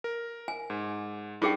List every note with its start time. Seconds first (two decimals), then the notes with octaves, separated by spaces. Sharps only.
0.04 A#4
0.48 G#5
0.70 G#2
1.42 G2 D#4 G#4 G5